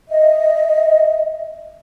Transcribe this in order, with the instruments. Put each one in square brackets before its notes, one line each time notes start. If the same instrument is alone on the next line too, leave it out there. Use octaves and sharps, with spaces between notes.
[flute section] D#5 E5